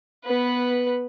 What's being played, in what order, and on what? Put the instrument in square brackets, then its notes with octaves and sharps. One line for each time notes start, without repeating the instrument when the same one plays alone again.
[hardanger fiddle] B3 B4